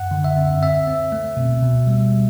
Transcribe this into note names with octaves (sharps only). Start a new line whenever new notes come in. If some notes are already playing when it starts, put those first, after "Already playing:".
Already playing: F#2 F#5
D3
E5
C4
C4 E5
C4
A3
B2
B2
G3